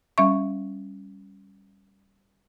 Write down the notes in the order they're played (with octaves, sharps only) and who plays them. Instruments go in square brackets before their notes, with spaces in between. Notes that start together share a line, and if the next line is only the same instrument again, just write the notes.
[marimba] G3 C#4 E5 C#6